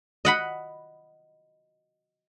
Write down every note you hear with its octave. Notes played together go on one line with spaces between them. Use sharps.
D#5 F#5 B5